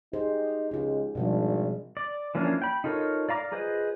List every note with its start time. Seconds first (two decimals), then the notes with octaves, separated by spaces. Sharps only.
0.13 D#4 G4 G#4 C5
0.71 C#2 G#3 D#4 F4
1.15 G#1 B2 F3 G3 D4
1.97 D5
2.35 E3 F3 A#3 C#4 D4
2.62 G5 B5
2.84 D#4 F4 A4 A#4 C#5
3.29 D5 F5 A#5 D6
3.52 F4 G#4 B4 C5 D#5